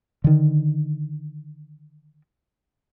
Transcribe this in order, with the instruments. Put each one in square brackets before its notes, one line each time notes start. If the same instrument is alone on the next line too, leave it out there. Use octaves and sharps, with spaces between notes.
[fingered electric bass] D3 D#3